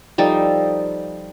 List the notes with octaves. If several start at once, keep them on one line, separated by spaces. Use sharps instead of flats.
F3 G3 D#4 A4